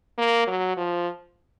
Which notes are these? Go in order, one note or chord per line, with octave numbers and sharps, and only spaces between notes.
A#3
F#3
F3